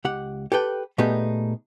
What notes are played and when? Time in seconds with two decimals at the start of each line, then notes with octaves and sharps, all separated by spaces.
0.05 C#2 G4 F#5
0.52 G4 A4 B4 G5
0.98 A#2 A3 B3 D#4 G4 G#4